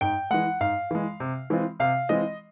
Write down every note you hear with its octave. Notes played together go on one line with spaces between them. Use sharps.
G#2 G5
E3 G#3 F#5
G#2 F5
E3 G#3
C3
E3 G#3 C4 F4
C3 F5
E3 G#3 C4 F4 D#5